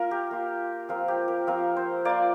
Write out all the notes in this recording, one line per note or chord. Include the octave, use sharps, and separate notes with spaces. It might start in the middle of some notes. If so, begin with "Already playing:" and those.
Already playing: A#3 F4 A#4
G4
A#3 F4
F3 C4 F4 A#4
G4
A#4
F3 C4 F4 A#4
C5
A#3 F4 D5